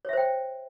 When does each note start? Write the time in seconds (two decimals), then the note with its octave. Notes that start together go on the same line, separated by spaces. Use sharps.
0.05 C#5
0.09 E5
0.13 C5
0.17 G5